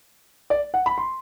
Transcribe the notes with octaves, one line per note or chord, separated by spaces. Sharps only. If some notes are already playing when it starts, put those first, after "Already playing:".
D5
F#5
B5
C6